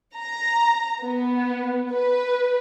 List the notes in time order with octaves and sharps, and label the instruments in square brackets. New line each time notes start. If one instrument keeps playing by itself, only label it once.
[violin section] A#5
B3
B4